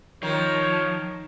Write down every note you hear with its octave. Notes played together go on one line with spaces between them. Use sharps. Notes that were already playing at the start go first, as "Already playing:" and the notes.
D#3 F3 C#5